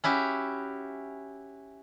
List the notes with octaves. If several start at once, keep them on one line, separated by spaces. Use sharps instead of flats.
C#4 E4 F#4 G4